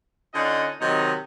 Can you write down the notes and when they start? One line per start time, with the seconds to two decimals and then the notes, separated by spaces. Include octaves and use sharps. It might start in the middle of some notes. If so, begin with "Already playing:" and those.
0.34 D3 C#4 D#4 F4 D#5 F#5
0.79 C3 D#3 F#3 D#4